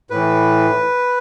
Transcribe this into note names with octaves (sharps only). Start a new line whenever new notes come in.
A2 E3 B4